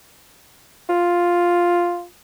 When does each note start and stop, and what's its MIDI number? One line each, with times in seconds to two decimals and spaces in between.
0.89 2.05 65